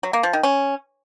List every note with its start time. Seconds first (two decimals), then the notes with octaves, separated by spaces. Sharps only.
0.03 F#3
0.13 A#3
0.23 F3
0.33 D#3
0.43 C#4